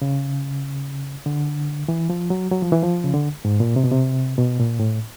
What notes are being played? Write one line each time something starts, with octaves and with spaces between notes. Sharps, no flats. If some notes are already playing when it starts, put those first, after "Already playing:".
C#3
D3
E3
F3
F#3
F#3
F3
E3
F3
C#3
D3
G#2
A#2
C3
B2
C3
B2
A#2
A2